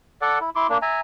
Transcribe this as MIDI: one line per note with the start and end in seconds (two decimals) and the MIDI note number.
0.21 0.39 69
0.21 0.39 74
0.21 0.39 78
0.40 0.50 64
0.56 0.67 64
0.56 0.67 84
0.56 0.67 86
0.69 0.78 58
0.69 0.78 62
0.82 1.01 76
0.82 1.01 80
0.82 1.01 82